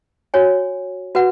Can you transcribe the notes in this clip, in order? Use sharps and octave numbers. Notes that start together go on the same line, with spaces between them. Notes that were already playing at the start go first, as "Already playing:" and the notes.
F#4 C#5 G#5
F#4 B4 F#5